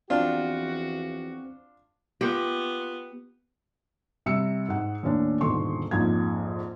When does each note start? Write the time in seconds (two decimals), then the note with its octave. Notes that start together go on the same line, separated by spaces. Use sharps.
0.10 E2 F3 C4 D4 F4 F#4
2.21 B3 F4 G4
4.26 C3 G3 E6 C#7
4.68 G#2 F#5
5.03 D#2 A2 C#4 D4
5.41 D#1 G#2 B2 D3 C6 C#6
5.91 A#1 F2 G#2 G#6